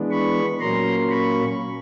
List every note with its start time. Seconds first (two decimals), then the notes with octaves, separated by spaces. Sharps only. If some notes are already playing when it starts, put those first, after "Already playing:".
Already playing: E3 G#3 B3 D4
0.11 B5 C#6
0.60 A#2 F#3 A#3 C#4 A#5 C6
1.10 B5 C#6